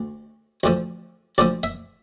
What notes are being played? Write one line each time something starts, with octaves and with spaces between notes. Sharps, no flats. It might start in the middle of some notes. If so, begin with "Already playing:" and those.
Already playing: D2
D2 D3 F3
D2 D3 F3 D5
E5